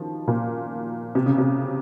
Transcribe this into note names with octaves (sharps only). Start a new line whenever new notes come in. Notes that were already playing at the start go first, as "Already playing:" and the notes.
Already playing: D#3 F3
A#2
C3
C#3
C3